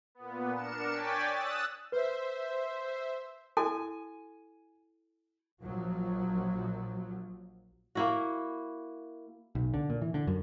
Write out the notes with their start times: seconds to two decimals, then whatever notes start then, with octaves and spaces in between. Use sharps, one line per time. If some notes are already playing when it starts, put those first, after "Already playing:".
0.15 A#2 B3
0.54 D4 A#4 C#7 E7
0.93 C#5 D5 G5 G#5 A6 B6
1.30 D#6 E6 F#6 A6
1.92 B4 C5 E5
3.57 E4 F#4 A4 G#5
5.62 A#1 F3 F#3
7.95 A#3 E4 F#4
9.55 B1
9.74 D3
9.90 A#2
10.02 E3
10.14 D3
10.27 F#2